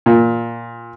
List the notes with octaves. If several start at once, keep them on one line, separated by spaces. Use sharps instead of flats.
A#2